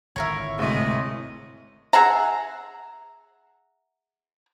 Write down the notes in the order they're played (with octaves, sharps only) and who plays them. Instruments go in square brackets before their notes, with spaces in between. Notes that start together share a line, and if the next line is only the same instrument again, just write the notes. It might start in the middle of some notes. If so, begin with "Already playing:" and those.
[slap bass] G#1 A#2 D3 [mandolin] E4 A#4 C#5
[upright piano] D2 A2 E5 [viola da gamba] C3 G#3 D#5
[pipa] G#4 E5 F#5 A#5